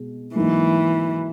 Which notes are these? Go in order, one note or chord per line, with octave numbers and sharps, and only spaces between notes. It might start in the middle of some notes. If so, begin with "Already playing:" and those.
Already playing: B2 G#3
G#2 E3 F#3 A#3 D#4